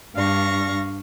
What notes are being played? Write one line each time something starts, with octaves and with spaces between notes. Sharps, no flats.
G2 D4 F5 C#6 A#6